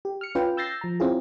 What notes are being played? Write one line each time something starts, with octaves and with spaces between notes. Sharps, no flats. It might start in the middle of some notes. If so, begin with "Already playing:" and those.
G4
F6 C#7
C#4 F4 B4 G5
E6 G6 A6 A#6 C7
F3 A#5
C4 C#4 E4 F4 G#4